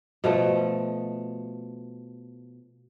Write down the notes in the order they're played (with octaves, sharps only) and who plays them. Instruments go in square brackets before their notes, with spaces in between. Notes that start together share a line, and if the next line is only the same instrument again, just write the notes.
[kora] B2 F3 A3